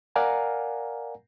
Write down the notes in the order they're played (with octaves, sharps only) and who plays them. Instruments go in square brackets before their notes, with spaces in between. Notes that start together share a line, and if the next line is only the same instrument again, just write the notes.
[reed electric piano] A#4 D5 F5 F#5 G#5 A#5